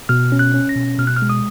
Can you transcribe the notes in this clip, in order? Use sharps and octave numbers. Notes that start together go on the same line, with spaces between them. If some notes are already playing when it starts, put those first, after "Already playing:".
B2 F6
C#4
F#6
C#4
A#6
B2
B2 F6
F#6
F6
G#3
D#6